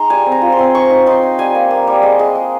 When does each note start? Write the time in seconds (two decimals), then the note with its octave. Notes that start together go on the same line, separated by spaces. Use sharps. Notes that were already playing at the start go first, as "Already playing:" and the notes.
Already playing: G#3 D#4 A#5 C6
0.10 G3 G#5
0.26 C4
0.32 A#5
0.42 F4
0.52 C6
0.59 C4
0.74 D#4 C#6
0.90 D#4
1.06 D#4 C6
1.23 D#4
1.38 G3 G#5
1.55 A#3
1.71 A#3
1.87 G3
2.03 G#3
2.19 G#3
2.35 G#3